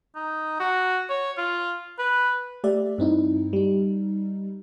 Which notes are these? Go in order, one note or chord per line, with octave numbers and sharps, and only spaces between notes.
D#4
F#4
C#5
F4
B4
A3 G4 D5 E5
G2 C4 D#4 E4
G3 D#4